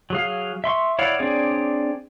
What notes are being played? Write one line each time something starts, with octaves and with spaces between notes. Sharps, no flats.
F#3 G#4 F5
E5 C6 C#6
E4 C#5 D5 F5 F#5
C4 D4 G#4 C#5 D5